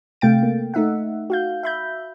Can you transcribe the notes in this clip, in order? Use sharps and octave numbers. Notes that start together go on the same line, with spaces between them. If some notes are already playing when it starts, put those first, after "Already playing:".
C3 A3 F5 G5 A6 D7
A#3
A3 D#4 E5 F#5
F#4 F5 G6
E5 B5 G6